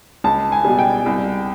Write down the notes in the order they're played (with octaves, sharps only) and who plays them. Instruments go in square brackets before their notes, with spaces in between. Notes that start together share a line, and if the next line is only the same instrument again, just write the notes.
[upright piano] C#2 A5
G#5
B2 G3
G5
C2